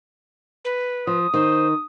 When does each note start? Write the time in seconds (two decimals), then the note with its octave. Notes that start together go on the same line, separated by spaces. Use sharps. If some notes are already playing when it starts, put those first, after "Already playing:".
0.65 B4
1.07 F3 D#6
1.34 D#3 C5